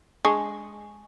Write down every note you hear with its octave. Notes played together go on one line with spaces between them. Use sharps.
G#3 D4 G#4 C#6